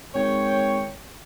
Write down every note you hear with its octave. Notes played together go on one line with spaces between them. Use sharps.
G#1 C#5 G5